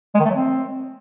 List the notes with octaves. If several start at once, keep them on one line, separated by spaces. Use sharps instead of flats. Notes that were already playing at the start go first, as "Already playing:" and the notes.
G#3
D#3
A3
F#3
C4